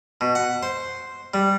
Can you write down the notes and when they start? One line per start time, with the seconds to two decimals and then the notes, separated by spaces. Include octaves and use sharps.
0.21 B2
0.35 F#5
0.63 C5
1.34 G3